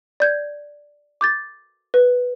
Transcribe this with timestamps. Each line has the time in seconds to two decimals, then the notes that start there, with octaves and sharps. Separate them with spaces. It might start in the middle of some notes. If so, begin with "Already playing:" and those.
0.20 D5 G6 G#6
1.21 D6 G6 A6
1.94 B4